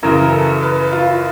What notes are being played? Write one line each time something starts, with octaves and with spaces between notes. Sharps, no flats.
F#2 C#3 E3 A#4
A4
B4
F4